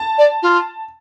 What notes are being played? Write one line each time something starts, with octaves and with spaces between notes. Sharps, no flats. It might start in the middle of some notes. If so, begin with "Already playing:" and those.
Already playing: A5
D5
F4